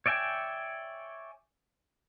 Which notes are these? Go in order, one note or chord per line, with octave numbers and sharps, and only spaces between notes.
C#5 D5 E5 G5 G#5